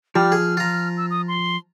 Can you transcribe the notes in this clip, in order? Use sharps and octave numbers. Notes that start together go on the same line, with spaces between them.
F3 G3 F6
G#4
F4 A#5
E6
D#6
C6